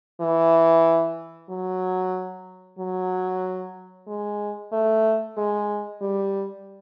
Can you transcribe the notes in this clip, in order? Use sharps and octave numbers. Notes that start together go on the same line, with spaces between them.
E3
F#3
F#3
G#3
A3
G#3
G3